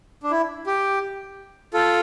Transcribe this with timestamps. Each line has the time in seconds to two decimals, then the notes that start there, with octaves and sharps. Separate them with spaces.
0.23 D4
0.31 E4
0.67 G4
1.74 F4 A4